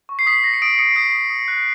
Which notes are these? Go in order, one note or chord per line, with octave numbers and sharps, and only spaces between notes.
C#6
C7
D#6 B6
D#6 A#6
C#7
D#6 D7
D#6 C#7
D#6 C7
D#6
D#6
F#6